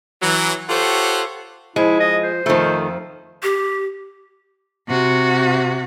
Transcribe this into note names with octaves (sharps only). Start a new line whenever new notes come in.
E3 F#3
F4 G4 A4 C5 C#5 F#5
F3 G#3 E4
D#5
C5
F2 D#3 F3 A3
G4
C3 F#4